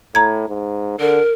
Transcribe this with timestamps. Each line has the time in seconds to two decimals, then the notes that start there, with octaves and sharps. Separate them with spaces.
0.15 A2 A#5 G#6
0.49 G#2
0.99 D3 A#4